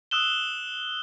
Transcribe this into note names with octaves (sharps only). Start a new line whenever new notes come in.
D#6 E6 F#6 E7 G7